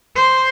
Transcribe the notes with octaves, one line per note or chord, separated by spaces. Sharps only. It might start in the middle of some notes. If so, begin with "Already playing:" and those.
C5